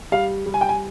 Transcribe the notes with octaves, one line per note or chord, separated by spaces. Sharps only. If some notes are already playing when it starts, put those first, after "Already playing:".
G3 F5
G3
G#5
G5
G#5